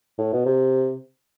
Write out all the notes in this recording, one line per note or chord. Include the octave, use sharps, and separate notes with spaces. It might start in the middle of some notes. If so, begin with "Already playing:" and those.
A2
B2
C3